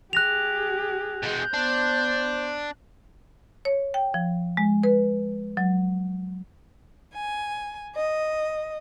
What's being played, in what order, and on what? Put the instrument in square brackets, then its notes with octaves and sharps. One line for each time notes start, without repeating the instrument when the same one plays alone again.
[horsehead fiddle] G4 G#4 [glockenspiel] F#6 A#6 F7
[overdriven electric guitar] B2 G#3 [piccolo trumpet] G6
[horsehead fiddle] B3 C5 [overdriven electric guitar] D4
[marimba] C#5
G5
F3
G#3
B4
F#3
[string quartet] G#5
D#5